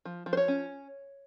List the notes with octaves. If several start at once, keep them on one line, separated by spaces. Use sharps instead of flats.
F3
F3
C5
C#5
C#4